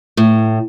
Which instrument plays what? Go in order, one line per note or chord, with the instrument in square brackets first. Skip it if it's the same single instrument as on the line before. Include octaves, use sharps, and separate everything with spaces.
[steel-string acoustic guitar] A2